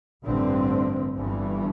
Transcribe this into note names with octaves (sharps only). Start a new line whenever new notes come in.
A1 G2 D3 C4
G1 G2 E3